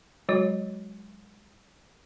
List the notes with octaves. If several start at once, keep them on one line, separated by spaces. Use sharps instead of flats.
F#3 G#3 F#4 C#5